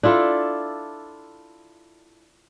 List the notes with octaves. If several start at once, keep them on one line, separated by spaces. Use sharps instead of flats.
D4 E4 F4 A4